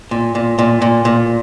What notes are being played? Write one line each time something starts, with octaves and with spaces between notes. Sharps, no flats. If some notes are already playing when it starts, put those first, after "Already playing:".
A#2
A#2
A#2
A#2
A#2